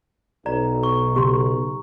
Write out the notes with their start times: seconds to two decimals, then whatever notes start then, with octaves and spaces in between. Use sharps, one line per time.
0.46 B1 D5 A#5
0.83 C#6
1.16 C#3 B3 G4 C6